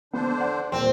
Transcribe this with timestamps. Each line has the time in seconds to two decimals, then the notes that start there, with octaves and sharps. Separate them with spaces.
0.14 D3 B3 D4 C5
0.38 D5 F#5
0.72 D#1 A#2 C4